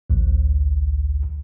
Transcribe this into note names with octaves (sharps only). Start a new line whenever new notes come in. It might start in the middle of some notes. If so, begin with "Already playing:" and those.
A1 D2